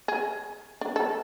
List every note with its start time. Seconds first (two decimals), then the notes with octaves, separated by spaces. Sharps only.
0.08 G#4
0.81 D4
0.96 A4